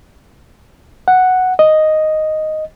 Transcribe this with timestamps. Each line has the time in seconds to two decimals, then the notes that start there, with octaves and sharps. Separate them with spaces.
1.08 F#5
1.59 D#5